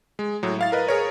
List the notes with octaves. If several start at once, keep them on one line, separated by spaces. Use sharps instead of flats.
G#3
A2 F#3
E4 F5 A6
A#4 B4 D#5
G#4 A#4 C#5